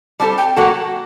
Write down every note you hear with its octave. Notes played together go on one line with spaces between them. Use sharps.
G3 C4 F#4 A4 A5
G5
F#3 A#3 F#4 A4 F#5